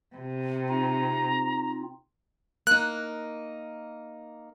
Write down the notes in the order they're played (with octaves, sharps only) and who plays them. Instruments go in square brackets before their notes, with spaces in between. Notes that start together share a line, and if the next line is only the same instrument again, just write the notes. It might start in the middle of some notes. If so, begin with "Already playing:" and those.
[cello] C3
[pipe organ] C4 D#4 F4 [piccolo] A#5
[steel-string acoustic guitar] A#3 D#4 [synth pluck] F#6